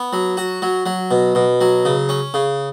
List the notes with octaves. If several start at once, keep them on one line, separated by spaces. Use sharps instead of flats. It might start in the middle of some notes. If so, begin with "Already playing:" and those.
Already playing: B3
F#3
F#4
F#3
F#3
B2
B2
F#3
C#3
C#4
C#3